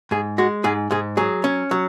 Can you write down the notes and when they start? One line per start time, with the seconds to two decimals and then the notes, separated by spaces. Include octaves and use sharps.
0.11 G#2 G#4
0.38 G#3 F#4
0.64 G#2 G#4
0.91 G#2 G#4
1.17 F#3 G#4
1.44 C#4
1.71 F#3